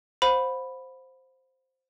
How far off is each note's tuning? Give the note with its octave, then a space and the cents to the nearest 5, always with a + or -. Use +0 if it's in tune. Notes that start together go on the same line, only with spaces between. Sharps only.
C5 +0 F5 +45 B5 +0